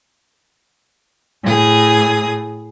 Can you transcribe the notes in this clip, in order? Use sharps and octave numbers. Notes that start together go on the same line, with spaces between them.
A2 G#4 D#6